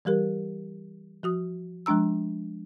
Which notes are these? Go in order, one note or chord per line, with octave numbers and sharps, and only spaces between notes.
E3 G3 G4 A#4
F3 F#4 D#6
F3 G#3 D4 A#5 E6